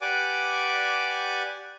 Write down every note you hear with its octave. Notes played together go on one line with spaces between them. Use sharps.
G4 B4 D5 F#5 G#5 D6